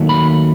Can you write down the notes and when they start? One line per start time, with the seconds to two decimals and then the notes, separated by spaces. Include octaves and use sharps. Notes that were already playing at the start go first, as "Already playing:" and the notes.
Already playing: D#2 D#3 F#3 A3
0.09 B5